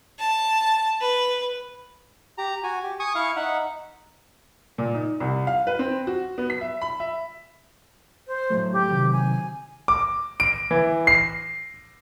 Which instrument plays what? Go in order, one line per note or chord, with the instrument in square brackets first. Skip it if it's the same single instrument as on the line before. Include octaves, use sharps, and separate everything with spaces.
[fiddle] A5
B4
[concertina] G4 A#5
F#4 G#5
G4
G#5 C#6 D#6
E4 F5 C#6
D#4 E5 F#5
[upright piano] A#2
D#4
C2
F5
B4
C4
F#4
B3
B6
E5
B5
E5
[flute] C5
[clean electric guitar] A2 F#3 A3
[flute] G4
[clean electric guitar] C3 D#3 F#3
[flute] G#5
[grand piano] D6
D7
E3
C7